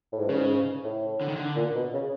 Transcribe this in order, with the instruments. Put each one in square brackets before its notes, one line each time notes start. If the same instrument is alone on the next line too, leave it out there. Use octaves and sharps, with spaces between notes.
[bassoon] A2
G#2
G2
[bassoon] G#2 [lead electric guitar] C#3
[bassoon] A2
[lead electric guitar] D3
D#3
D3
[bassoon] A#2
B2
C#3